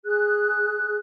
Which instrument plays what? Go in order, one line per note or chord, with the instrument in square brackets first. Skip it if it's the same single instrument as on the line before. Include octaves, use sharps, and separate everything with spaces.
[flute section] G#4 F#6